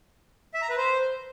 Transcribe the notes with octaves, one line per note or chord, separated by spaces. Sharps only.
E5
A#5
B4
C5